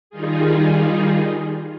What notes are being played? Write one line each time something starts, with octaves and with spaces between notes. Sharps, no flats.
D#3 G3 D#4 F4 G#4